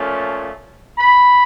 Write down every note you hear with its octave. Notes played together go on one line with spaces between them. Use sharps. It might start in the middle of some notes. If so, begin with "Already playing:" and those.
Already playing: A#2 F3 A3 C#4
B5